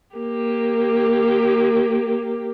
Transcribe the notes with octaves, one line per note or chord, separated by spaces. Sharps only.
A#3 G4